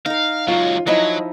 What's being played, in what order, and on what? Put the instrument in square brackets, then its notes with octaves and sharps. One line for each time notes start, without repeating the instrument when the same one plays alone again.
[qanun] D#4 A#4 [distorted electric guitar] F5
[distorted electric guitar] C#2 F#3 [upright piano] F4
[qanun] F3 D#4 E4 [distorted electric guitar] F#3 [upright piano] D#5